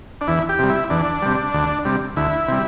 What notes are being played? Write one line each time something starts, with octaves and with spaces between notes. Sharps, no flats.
D4
E2 E4
G4
C3 G3
E4
E2 D4
C3 G3
D2
C3 G3
D2 E4
C3 G3